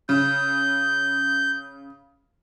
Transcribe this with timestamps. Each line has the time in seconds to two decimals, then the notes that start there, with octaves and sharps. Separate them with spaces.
0.09 C#3 G6